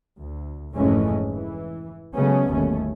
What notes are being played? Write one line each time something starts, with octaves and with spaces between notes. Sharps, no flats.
D2
F1 G#2 E3 G#3 A3 C#4
E3
C#3 F#3 G#3 A3 B3 C#4
G1 D#2 B2 A3 C#4